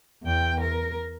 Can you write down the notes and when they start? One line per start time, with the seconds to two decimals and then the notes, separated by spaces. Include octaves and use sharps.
0.23 E2 G5
0.61 A#4